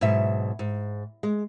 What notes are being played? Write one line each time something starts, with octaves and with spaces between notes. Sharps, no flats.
G#2 B2 F#3 E5
G#2
G#3